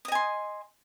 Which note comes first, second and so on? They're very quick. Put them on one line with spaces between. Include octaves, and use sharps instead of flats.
D#6 D#5 G#5 C6